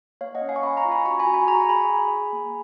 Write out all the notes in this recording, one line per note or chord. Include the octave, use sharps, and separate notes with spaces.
A#3 C#5 F5
D#5 F#5
C#4
F5 G#5
C#6
C#4 G#5 B5
A#5 C#6
F4
G#5 B5
F#4 A#5 C#6
G#5 B5
F#4
G#5 B5
G#4 A#5 C#6
G#4 G#5 B5
G#4
G#4
A#3